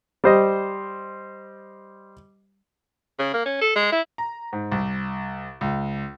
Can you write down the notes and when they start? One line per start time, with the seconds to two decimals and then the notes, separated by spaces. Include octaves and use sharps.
0.24 G3 C5 D#5
3.19 C#3
3.34 A#3
3.46 C#4
3.61 A4
3.76 G#3
3.92 E4
4.18 A#5
4.53 G#2
4.72 C2
5.61 C#2